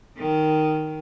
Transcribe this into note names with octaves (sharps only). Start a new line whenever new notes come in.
D#3